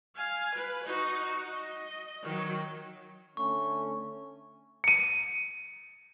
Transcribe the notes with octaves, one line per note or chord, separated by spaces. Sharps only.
F5 G#5
B4
D#4 F#4
D#5
D#3 F#3
D3 A3 C#4 C#6
C#7 D#7